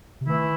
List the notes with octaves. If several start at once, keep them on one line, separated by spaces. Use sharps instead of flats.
C3
D#3 E3 A3 E4